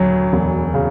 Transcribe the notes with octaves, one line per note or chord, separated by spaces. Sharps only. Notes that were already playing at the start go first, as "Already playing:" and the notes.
Already playing: D2 F#3
E1
C#3